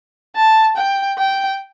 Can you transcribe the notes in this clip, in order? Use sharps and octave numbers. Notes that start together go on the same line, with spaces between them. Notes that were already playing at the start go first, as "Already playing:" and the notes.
A5
G5
G5